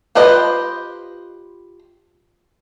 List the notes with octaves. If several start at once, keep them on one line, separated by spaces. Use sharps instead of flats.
F4 G4 B4 C5 D#5